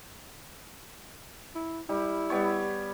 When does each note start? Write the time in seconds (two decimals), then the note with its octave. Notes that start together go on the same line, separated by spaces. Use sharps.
1.55 E4
1.89 G3 E4
2.30 G3 B3 C#5